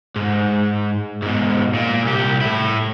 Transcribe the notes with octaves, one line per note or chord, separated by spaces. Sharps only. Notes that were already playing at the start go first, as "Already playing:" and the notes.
G#2
G#2 B2
A#2
C2 G4
A2 E4